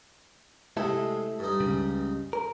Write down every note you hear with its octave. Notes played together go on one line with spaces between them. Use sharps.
C3 G#3 A3 E4 A4
G2 D#4
C#2 C#3
A#4